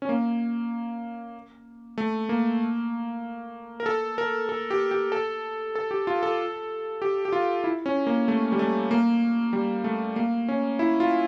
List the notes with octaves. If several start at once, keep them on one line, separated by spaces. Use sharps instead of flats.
C#4
A#3
A3
A#3
A#4
A4
A#4
A4
G4
G4
A4
A4
G4
F4
A4
G4
G4
F4
E4
C#4
A#3
A3
G3
A3
A#3
G3
A3
A#3
C#4
E4
F4